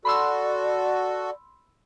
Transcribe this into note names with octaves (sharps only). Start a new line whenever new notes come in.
F#4 A4 D5 B5 C6 E6